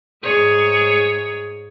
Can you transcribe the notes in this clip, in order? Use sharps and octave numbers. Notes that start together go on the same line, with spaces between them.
G#2 G#4 C#5